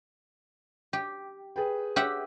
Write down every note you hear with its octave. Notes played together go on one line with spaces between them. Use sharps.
G4
G#4 B4 G5
G4 E5 F#5